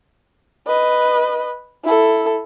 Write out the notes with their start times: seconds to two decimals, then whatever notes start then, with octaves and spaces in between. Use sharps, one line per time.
0.67 B4 D#5
1.84 E4 A4